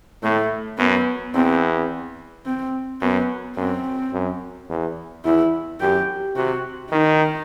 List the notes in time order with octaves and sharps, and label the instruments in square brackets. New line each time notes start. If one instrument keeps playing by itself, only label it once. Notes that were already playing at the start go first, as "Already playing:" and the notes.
[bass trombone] A2 [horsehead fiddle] A3
[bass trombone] F#2 [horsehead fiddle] B3
[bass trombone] E2 [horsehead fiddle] C4
[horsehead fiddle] C4
[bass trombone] F#2 [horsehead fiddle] B3
[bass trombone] F#2 [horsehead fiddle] C4
[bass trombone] F#2
E2
[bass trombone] E2 [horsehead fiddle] E4
[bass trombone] F#2 [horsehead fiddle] G4
[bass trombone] C3 [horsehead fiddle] F#4
[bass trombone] D#3 [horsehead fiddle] D#4